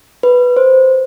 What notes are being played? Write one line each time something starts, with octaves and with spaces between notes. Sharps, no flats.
B4
C5